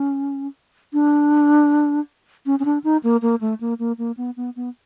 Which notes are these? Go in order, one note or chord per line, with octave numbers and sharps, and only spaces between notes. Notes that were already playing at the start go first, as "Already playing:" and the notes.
Already playing: C#4
D4
C#4
C#4
D4
D#4
A#3
A#3
A3
A#3
A#3
A#3
B3
B3
B3